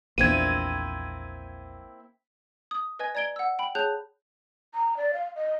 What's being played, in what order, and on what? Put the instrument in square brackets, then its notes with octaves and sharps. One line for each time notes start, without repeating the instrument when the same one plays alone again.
[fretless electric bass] A#1 E2 [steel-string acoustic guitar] A#3 C4 E4 [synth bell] G#6 D#7
[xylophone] D#6
B4 D#5 G#5 G#6
D5 A#5 G#6 D7 G7
F#5 E6
G5 B5
G#4 C#5 A5 F#6 G6 F7
[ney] A#5
D5
F5
D#5